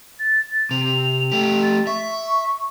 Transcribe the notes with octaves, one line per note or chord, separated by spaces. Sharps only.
A6
C3 F7
A3 G4
A6
E5 C#6